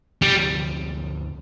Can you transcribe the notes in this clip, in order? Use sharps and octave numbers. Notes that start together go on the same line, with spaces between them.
D2 C3 F3 G3